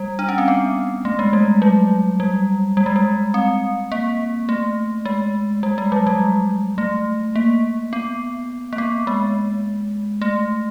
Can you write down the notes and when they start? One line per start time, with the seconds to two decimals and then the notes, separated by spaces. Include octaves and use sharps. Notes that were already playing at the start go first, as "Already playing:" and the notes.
Already playing: G3
0.19 D4
0.29 C#4
0.38 C4
0.48 B3
1.05 A3
1.19 G#3
1.33 G3
1.62 F#3
2.20 G3
2.77 G3
2.86 G#3
2.96 G3
3.34 C4
3.92 A#3
4.49 A3
5.06 G#3
5.63 G3
5.78 G#3
5.92 F#3
6.07 G3
6.78 A3
7.36 A#3
7.93 B3
8.73 A#3
8.78 B3
9.07 G#3
10.22 A3